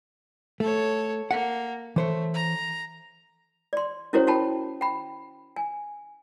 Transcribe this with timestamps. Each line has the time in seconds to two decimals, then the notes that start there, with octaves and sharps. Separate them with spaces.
0.60 A3 A4 C#5
1.31 A#3 F#5
1.96 E3 A3 C5 C#5
2.34 A#5
3.73 D5 C6
4.13 C#4 E4 F#4 A#4 C5 C#5
4.27 E4 F#4 G5 A5 B5
4.81 G5 B5
5.56 G#5